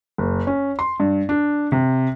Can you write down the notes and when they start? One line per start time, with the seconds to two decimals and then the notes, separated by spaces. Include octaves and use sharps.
0.18 F#1
0.47 C#4
0.79 C6
1.00 G2
1.29 D4
1.72 C3